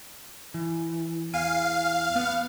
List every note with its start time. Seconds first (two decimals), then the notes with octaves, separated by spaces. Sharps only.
0.54 E3
1.33 E2 F5 G#5
2.16 B3 B4